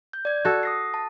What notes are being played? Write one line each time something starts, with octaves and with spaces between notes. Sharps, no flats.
G6
D5 G#6
F#4 A4
D#6 A#6 C7
A5